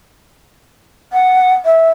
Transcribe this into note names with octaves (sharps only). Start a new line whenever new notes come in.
F#5
E5